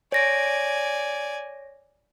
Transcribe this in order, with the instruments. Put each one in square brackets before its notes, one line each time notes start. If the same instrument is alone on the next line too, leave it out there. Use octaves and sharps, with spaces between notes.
[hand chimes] C#5 A#6 D7 [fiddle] D5 G#5